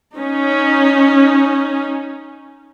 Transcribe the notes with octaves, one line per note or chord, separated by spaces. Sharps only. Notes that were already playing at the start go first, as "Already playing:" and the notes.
C#4 D#4